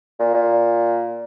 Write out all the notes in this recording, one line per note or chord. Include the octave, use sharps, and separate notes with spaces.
A#2
A#2